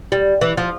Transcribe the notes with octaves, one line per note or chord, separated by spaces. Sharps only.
G3
E3
F3